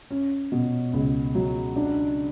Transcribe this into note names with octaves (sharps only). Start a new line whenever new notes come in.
C#4
B2
C#2
F#3
D4